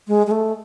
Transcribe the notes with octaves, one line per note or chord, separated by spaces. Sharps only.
G#3
G#3
A3